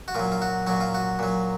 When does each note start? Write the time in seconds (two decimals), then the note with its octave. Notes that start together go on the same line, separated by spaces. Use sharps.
0.08 F#4
0.15 A#2 F#3 F4
0.32 F4
0.42 F#4
0.67 A#2 F#3 F#4
0.81 F4
0.94 F#4
1.19 A#2 F#3